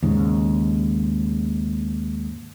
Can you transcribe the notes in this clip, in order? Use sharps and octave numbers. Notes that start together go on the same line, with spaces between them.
D#2 G#2 C#3